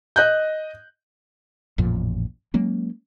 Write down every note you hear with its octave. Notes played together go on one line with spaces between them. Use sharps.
D#5 F#6 G6
A1 F2 A#2 F3
F#3 G#3 A#3 C#4